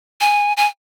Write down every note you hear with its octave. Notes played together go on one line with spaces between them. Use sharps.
G#5
G#5